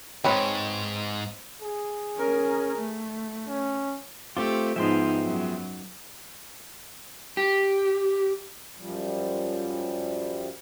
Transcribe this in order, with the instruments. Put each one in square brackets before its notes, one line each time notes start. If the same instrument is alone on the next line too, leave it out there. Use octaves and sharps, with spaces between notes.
[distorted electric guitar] D#2 G#2 [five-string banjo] C4 B4 C#5
[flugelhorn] G#4
[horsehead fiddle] C#4 A#4
A3
[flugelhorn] C#4
[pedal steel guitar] A3 C4 F4 [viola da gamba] G4 [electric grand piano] D6
[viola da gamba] G#2 D#4 [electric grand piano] F3 G#3 B3 [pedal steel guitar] E5 G5 C6
[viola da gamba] F#2
[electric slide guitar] G4
[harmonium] F#2 F3 G3